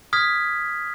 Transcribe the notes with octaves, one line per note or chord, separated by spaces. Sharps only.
D#6 F6 G#6 B6